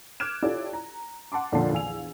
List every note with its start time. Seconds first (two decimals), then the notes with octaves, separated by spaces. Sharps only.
0.20 D6 F6 F#6 G#6 D7 E7
0.43 E4 F4 G4 A4 C#5 D5
0.73 A#5
1.32 F#5 A5 C6 D6
1.52 F2 A#2 D3 F4 A5 C7
1.72 A#1 E2 F5 G#5 E6 F7